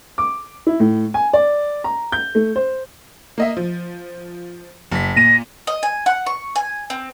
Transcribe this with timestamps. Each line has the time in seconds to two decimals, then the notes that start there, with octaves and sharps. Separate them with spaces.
0.18 D6
0.67 E4
0.80 A2
1.14 G#5
1.33 D5
1.84 A#5
2.12 G6
2.35 A3
2.56 C5
3.38 A#3 D#5 E5
3.57 F3
4.92 F#1 B6
5.16 A#2 A#6 D#7
5.67 D#5
5.83 G#5
6.06 F#5
6.26 C#6
6.56 G#5
6.90 C4